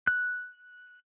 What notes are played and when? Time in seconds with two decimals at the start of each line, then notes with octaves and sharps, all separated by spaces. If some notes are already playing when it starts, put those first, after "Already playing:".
0.07 F#6